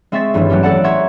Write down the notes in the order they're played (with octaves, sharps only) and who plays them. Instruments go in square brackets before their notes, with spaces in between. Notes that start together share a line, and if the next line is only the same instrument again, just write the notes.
[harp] G#3 C4 E5 C#6 A6 B6
A1 G2 D#3 E3
F#3 A3 B3 C#4 G4
A4 D5 F#5 A5
E5 F#5 A#5 C6 C#6 G#6